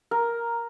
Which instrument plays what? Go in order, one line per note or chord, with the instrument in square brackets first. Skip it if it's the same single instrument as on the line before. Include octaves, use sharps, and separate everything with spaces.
[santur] A#4